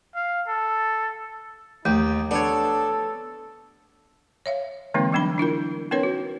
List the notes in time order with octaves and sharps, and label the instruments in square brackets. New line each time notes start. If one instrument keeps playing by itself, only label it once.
[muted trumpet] F5
A4
[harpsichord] D#2 [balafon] A3 [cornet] D#4 [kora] G4
[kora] B3 C#5 [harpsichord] D4 [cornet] A4
[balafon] C#5 E5 F5
D3 E3 G#3 A#3 C4 D#4
F#3 G3 B3 D4 B5
D4 E4 F4 A#4
B3 C#4 D#4 A#4 B4 C#5
F#4